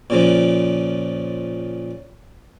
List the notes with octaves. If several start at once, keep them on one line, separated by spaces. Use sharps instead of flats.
A#2 C#3 F3